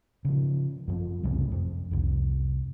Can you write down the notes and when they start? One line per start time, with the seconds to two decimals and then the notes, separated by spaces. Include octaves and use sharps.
0.25 C#3 F3
0.88 F#2 F3
1.24 C2 F2 A2 C#3
1.52 F2
1.91 C2 F2